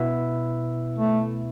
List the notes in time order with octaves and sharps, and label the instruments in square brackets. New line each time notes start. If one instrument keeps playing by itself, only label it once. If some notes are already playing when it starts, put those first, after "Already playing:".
Already playing: [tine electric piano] B2 B3 E4 B4 E5
[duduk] A3